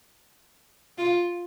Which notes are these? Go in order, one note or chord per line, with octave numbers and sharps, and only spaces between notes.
F4